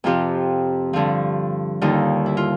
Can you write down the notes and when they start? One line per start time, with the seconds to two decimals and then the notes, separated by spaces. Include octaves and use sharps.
0.04 F2 C3 F3 F4 G4
0.93 G2 D3 F3
1.81 D#2 D3 G3 D#4 F4
2.26 E4
2.37 F4